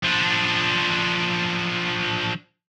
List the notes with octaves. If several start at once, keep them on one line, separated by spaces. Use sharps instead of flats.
F3 D4